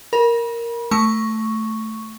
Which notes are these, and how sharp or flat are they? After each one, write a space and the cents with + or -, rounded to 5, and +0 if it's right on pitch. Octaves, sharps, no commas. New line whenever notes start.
A#4 +0 B5 -35
A3 +0 C#6 +0